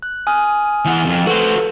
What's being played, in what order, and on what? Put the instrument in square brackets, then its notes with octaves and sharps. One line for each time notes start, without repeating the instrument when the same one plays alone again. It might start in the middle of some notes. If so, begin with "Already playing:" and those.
[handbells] F#6
G#5 D#6 F6
[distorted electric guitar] E3 F#5
F2
[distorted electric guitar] F#4 C5 [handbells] A4 B4